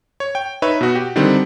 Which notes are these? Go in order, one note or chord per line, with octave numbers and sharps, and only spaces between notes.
C#5
G5
D#4 B4 C#5 E5
B2 F#4
G4
D3 D#3 G3 C4 D#4